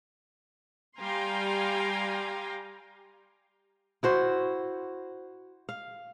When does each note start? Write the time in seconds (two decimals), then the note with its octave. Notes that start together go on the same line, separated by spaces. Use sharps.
0.99 G3 F5 G5 G#5 A#5 C6
4.03 E4 F#4 C5
5.69 F5